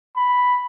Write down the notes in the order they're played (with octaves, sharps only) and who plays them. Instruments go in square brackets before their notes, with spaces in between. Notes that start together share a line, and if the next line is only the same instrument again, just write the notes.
[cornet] B5